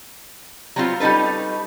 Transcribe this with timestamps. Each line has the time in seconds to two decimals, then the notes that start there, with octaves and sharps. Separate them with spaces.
0.76 F#3 G3 B3 C4 F4
1.00 G3 C#4 D#4 A4 B4